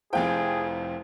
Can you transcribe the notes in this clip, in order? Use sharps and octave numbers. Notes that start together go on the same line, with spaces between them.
F1 F2 E4 G#4 C5 F5 G5